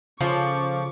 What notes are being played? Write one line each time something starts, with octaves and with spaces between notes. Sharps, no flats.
C#3 F3 C#4 F4 A4 C#6 D6